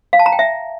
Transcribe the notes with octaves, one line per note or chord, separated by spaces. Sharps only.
F5
A5
A#5
G5
E5